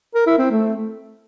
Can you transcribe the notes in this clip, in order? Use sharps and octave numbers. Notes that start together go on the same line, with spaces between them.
A#4
E4
C4
A3